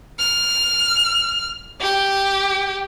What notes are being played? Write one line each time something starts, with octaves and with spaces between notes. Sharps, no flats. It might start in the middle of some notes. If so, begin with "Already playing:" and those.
F6
G4